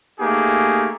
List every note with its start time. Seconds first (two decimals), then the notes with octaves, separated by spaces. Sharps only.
0.19 A3 A#3 D#4 G4 G#4